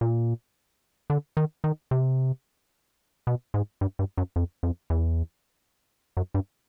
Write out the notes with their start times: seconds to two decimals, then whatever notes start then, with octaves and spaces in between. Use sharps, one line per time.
0.01 A#2
1.10 D3
1.37 D#3
1.64 D#3
1.91 C3
3.27 B2
3.54 G#2
3.81 G2
3.99 G2
4.18 F#2
4.36 F2
4.63 F2
4.90 E2
6.17 F#2
6.34 G2